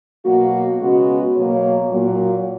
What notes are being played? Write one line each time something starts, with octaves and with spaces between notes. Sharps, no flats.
B2 F#3 A#3 F#4
C#3 G#3 B3 F#4
B2 F#3 A#3 C#5
A#2 F#3 A#3